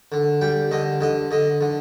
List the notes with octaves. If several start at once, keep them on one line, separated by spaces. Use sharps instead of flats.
D3
G3 G5
D3 D#5
D3 D#5
D3 D#5
D3